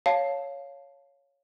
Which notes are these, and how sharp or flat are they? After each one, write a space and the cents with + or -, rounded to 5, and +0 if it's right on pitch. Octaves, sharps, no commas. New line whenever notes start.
C#5 +0 F5 +0 A5 +0